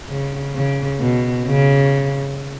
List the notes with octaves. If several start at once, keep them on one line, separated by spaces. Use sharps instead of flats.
C#3
C#3
B2
C#3